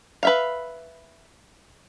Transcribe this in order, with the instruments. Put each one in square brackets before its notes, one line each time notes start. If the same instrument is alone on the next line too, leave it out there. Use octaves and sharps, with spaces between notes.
[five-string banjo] B4 E5 F5